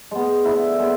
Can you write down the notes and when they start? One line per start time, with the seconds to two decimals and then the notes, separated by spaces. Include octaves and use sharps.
0.11 G#3 B3
0.45 D3 E4
0.79 G#3 B3